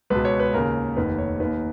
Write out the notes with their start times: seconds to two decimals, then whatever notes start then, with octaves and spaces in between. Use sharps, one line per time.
0.10 C#2 B2 B4
0.25 C#5
0.40 B4
0.54 D#2 C#3 A#4
0.97 F1 D#2 D#3 B4
1.18 C#5
1.40 D#2 D#3 B4